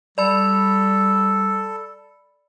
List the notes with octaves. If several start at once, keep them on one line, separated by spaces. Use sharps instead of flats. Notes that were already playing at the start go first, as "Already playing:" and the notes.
G3 A4 D5 B5